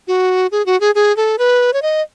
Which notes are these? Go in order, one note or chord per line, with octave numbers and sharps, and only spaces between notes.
F#4
G#4
F#4
G#4
G#4
A4
B4
C#5
D#5